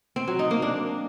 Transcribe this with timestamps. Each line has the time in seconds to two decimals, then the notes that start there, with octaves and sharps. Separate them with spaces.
0.16 C4
0.28 F#3
0.39 D#4
0.51 A#3
0.62 D4